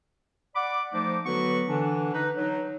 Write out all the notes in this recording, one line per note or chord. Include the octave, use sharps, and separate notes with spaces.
D5 F#5 B5 D6
F3 A3 D#4 C5 D6
D3 F#3 B3 F#4 B4 C#6
D3 E3 D4
D#4 B4
F#3 D#4